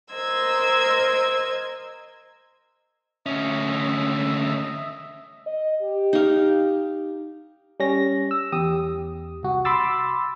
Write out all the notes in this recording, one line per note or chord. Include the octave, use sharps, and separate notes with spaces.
A#4 C5 D#5 C6 E6 G#6
D2 C#4 D#5 E5
D#5
G4
D#4 F5
G3 C#4 A#6
E6
E2 G4 D#6
C2 F#4
B5 C6 D6 E6 A6